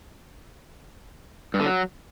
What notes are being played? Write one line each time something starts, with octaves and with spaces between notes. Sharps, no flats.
G2
D3
F#3